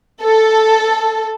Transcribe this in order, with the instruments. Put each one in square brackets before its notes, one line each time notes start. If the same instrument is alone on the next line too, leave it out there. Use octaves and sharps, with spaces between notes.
[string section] A4